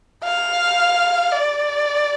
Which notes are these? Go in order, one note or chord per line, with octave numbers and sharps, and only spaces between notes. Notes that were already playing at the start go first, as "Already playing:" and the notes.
F5
D5